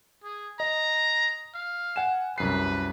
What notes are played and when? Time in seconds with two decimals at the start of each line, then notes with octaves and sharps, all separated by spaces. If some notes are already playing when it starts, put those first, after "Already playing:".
0.24 G#4
0.60 D#5 A#5
1.55 F5
1.96 F#5 G#5 E7
2.38 C2 F#2 B4 C7